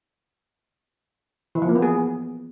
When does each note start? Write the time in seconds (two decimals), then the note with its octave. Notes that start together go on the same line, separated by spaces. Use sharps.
1.55 E3
1.62 F3
1.69 A#3
1.76 B3
1.82 G#4